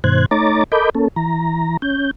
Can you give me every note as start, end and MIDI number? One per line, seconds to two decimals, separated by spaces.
0.04 0.26 43
0.04 0.26 47
0.04 0.26 51
0.04 0.26 72
0.04 0.26 90
0.04 0.26 92
0.31 0.64 57
0.31 0.64 63
0.31 0.64 73
0.31 0.64 82
0.31 0.64 86
0.31 0.64 93
0.72 0.90 69
0.72 0.90 70
0.72 0.90 75
0.72 0.90 83
0.72 0.90 86
0.72 0.90 91
0.95 1.08 58
0.95 1.08 61
0.95 1.08 69
1.16 1.77 52
1.16 1.77 82
1.82 2.11 61
1.82 2.11 91